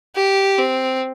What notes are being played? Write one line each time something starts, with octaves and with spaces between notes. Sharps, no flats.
G4
C4